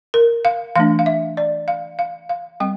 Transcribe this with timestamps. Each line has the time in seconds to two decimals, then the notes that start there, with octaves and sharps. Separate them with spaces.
0.14 A#4
0.45 F5
0.76 E3 A3 D4 F5
0.99 F5
1.06 E5
1.37 D5
1.68 F5
1.99 F5
2.29 F5
2.60 G3 C4 G5